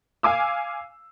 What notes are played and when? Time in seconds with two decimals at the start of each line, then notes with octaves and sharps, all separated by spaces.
0.23 F5 G#5 D6 E6